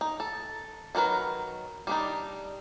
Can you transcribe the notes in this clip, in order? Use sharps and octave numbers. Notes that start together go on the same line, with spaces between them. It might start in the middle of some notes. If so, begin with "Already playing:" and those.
D#4
A4
D#3 F#3 A#4 B4
G3 D4 D#4